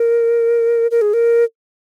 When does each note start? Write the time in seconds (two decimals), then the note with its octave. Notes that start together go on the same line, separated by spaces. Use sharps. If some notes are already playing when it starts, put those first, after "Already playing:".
Already playing: A#4
0.91 A#4
1.02 G#4
1.14 A#4